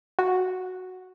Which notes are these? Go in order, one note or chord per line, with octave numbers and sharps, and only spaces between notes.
F#4